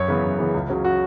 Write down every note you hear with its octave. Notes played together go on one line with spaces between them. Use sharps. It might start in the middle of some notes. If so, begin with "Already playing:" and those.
Already playing: F#2 C#5
C#3 E3 B3
F#2
C#3 E3 B3
C#2
C#3 F#3 C#4
F#4